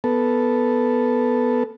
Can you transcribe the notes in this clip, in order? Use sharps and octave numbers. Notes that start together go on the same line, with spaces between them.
B3 A4